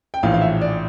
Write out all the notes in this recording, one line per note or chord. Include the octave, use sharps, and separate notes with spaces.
G5
A#1 A2 E3 F5
F5
E5
D5